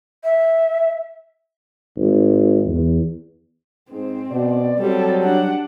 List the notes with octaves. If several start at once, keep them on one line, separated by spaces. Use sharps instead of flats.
E5
G#1
E2
G#2 C4
B2 D5
F#3 G3 C4 A4
D4 F#5